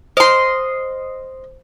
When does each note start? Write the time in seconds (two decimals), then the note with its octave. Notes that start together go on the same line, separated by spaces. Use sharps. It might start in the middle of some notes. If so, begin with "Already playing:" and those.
0.17 C5 D#5 C6